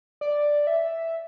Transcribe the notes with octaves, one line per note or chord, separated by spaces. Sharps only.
D5
E5